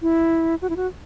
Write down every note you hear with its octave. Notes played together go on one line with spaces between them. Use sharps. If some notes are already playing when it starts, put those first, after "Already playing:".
E4
F#4
E4
F#4